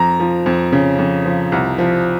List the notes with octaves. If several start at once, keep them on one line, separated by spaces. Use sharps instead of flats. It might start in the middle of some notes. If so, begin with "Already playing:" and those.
Already playing: F2 A#5
F3
F2
C#3
F2
F3
C2
F3